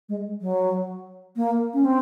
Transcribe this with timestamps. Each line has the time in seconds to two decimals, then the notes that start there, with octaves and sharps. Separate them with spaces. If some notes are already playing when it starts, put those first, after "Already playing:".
0.09 G#3
0.41 F#3
1.36 A#3
1.74 C#4
1.85 C4